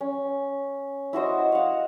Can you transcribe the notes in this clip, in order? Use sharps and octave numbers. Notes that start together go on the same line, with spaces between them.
C#4
E4 F#4 C5 D#5
F5 F#5